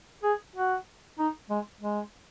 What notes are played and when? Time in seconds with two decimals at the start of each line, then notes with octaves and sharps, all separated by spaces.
0.23 G#4
0.56 F#4
1.19 D#4
1.50 G#3
1.81 G#3